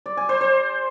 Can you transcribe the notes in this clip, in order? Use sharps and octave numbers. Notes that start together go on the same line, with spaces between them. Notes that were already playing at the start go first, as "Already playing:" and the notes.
D5
G#5
C5
C5